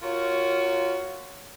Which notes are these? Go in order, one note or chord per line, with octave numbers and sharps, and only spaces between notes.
F4 F#4 A#4 C#5